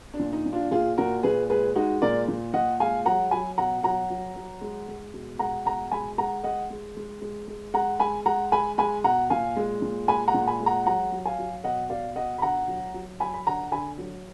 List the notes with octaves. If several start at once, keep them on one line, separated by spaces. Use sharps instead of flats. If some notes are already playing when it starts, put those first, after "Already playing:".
D4
A#2
D#4
A#2
D4 F4
A#2 F4 G#4
A#2 F#4 A#4
A#2 G#4 B4
G#3 G#4 B4
G#3 D#4 F#4
A#2 A#4 D5
A#2
A#2 D#5 F#5
G#3 F5 G#5
F#3 F#5 A#5
F#3 G#5 B5
B2 F#5 A#5
F#3 F#5 A#5
F#3
F#3
G#3
G#3
B2
G#3 F#5 A#5
B2 F#5 A#5
G#3 G#5 B5
G#3 F#5 A#5
G#3 D#5 F#5
G#3
G#3
G#3
G#3
G#3 F#5 A#5
G#3 G#5 B5
G#3 F#5 A#5
G#3 G#5 B5
G#3 G#5 B5
B2 F#5 A#5
A#2 F5 G#5
G#3
A#2
G#3 G#5 B5
F#5 A#5
A#2
G#5 B5
G#3
F#5 A#5
F#3 F#5 A#5
F#3
F5 G#5
F#3
B2 D#5 F#5
B2 D5 F5
B2 D#5 F#5
B5
D3 F#5 A#5
F#3
F#3
F#3 G#5 B5
B5
D3 F#5 A#5
D3 G#5 B5
F#3